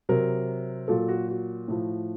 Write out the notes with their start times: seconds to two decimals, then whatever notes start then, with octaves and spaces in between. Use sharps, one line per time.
0.09 C3 F#3 A#4
0.88 A#2 F#3 A4
1.08 F#4
1.29 F#4
1.68 A2 F3